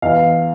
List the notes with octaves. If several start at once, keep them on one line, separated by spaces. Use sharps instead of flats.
E2 F5